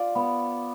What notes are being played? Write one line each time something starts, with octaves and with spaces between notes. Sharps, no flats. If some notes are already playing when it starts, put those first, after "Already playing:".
Already playing: F4 D5
B3